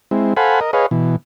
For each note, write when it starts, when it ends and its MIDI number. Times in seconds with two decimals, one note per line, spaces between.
0.11 0.34 56
0.11 0.34 60
0.11 0.34 64
0.37 0.60 69
0.37 0.60 72
0.37 0.60 77
0.37 0.60 78
0.37 0.60 80
0.37 0.60 83
0.61 0.71 70
0.61 0.71 75
0.73 0.86 68
0.73 0.86 71
0.73 0.86 73
0.73 0.86 75
0.73 0.86 77
0.91 1.16 47
0.91 1.16 52